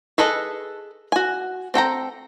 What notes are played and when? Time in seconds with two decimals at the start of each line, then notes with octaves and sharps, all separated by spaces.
0.18 G#4 A4 B4 D#5
1.12 F#4 G#5
1.74 C4 A4 G5 A#5